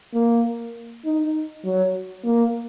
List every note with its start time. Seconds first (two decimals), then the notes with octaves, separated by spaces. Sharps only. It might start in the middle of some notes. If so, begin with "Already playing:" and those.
0.14 A#3
1.05 D#4
1.65 F#3
2.25 A#3